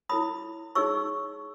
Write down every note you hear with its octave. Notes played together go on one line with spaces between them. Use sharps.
E4 A4 C#5 B5 D#6
D#4 G#4 C#5 C#6 E6